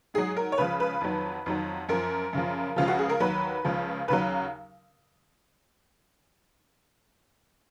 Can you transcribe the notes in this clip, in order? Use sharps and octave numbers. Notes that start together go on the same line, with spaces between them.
G#2 F#3 G#4
A#4
C#5
C#2 C#3 F3 B4
B4
F2 D#3 F#3
F2 D#3 F#3
F#2 F3 A#4
F#2 C#3 F3
C#2 C#3 F3 F4
F#4
G#4
A#4
D#2 D#3 F#3 B4
C#2 C#3 F3
D#2 C#3 F#3 B4